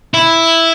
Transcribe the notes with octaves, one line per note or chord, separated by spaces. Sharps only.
E4